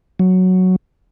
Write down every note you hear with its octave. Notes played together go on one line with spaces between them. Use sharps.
F#3